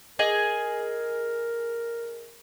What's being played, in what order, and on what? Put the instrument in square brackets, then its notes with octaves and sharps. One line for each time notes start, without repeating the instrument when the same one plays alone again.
[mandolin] G#4 D#5 G#5 [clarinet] A#4